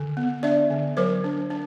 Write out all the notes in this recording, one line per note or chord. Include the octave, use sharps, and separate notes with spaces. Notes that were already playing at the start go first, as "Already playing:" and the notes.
Already playing: D3
B3
D4 D5 E5
D3
F#3 A#4 C5
D4
D4